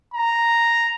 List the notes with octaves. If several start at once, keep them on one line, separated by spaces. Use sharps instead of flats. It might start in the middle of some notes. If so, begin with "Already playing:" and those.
A#5